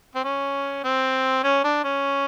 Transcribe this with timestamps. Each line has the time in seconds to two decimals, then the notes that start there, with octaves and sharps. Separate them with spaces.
0.15 C4
0.24 C#4
0.84 C4
1.44 C#4
1.64 D4
1.84 C#4